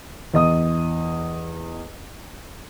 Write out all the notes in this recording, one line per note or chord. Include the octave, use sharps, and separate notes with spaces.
E2 D#5 D#6